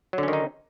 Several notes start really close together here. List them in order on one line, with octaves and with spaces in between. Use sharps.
F#3 D3 C#4 D#3 D#4